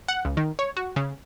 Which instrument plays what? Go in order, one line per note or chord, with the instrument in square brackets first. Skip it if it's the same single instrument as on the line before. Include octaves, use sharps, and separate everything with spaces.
[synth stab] F#5
C#2
D#3
C#5
F#4
C#3